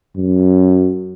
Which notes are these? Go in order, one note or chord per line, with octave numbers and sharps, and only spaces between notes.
F#2